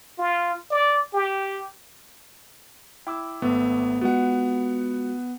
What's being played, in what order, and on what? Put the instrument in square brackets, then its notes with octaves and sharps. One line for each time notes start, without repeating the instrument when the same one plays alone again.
[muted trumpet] F4
D5
G4
[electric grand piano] E4 [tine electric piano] G5 D6 E6
[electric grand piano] G#1 A3 B3
[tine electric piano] G#3 F4 F#4 [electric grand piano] B3 F#5